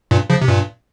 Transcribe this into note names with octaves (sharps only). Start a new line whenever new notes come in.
G2 A#2
C#3 F3
C3
G2 A#2